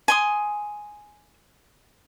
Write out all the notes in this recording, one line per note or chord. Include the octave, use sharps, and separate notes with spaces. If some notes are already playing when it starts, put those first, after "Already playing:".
G#5 C6 D#6